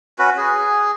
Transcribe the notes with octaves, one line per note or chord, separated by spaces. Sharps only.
C#4 F#4 B4
G#4